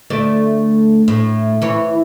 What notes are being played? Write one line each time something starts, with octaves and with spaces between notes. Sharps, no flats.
D2 A3 D5
A2
E3 C#5